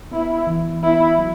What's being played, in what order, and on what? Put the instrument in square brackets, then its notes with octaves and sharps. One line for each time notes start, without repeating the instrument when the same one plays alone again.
[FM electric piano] B3 [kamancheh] E4
[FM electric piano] E3
[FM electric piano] B3 [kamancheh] E4
[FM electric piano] F#3